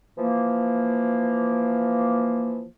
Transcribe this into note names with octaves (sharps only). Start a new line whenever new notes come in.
E3 F3 A#3